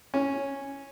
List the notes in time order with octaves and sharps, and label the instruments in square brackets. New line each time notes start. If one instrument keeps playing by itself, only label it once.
[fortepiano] C#4